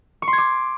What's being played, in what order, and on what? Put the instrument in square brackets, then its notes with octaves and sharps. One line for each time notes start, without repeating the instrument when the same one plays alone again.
[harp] C#6
C6
G#6
D6